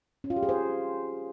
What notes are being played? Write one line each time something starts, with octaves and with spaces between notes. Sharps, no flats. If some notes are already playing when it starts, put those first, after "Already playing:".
C#4
F4
G4
G#4
C5